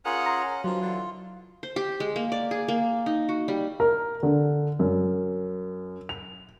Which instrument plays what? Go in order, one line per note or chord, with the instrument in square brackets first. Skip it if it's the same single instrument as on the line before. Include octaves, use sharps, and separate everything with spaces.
[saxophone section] C#4 F#5 [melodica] F4 G#4 A#4
[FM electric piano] A#5 C6
[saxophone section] G2 D#3 F3 [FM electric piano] F#3 [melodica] F4
[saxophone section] D3 E3
[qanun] C5
G4
G#3
A#3
D5
G#4
A#3
D#4
F#4
G3
[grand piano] A#4
D3
F#2
F7